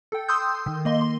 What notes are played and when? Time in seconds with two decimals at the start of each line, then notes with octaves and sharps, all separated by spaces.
0.12 A4 G5
0.28 C6 D#6 E6 G6
0.66 D#3
0.85 A#3 D#5 C6 G7
1.01 C6